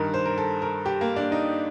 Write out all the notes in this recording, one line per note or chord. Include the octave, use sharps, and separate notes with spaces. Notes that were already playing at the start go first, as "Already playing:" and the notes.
Already playing: G2 D#3 A#4
C5
A#4
A4
A#4
G4
A#3
D4
D#4